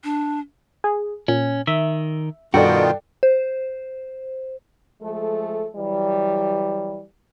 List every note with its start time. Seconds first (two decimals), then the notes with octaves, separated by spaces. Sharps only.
0.04 D4
0.84 G#4
1.28 A#2 C#4
1.67 D#3 E5
2.54 G2 B2 D#3 D4 F4 F#4 A4 G5
3.23 C5
5.01 F3 G#3 A3 A4
5.76 E3 F#3 G3